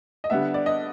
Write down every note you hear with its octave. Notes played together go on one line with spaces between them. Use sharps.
D#5
D3 G3 B3 E5
D5
D#5